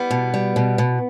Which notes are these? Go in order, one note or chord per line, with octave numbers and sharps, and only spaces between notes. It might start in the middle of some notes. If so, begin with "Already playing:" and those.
Already playing: G3 B3
B2
G3
B2
B2